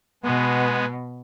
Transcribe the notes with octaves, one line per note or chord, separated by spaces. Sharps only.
B2 G#3 B3